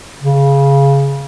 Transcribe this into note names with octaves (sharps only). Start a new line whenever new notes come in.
C#3